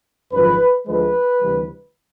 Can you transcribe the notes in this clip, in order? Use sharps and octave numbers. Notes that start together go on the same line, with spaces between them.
G#1 F#2 D3 F3 B4
D2 D3 F3 G#3 B4
D2 C3 E3 G3